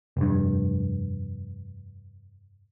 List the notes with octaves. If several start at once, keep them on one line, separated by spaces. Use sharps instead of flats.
F1 G2